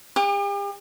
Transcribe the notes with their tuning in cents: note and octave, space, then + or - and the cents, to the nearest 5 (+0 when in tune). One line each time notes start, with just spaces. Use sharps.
G4 +45 D6 +35